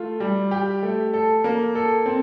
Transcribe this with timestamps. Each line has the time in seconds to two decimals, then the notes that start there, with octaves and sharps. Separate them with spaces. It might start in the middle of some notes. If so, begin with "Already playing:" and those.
Already playing: A3 F4
0.20 G3
0.51 G4
0.83 A3
1.13 A4
1.44 A#3
1.75 A4
2.06 C4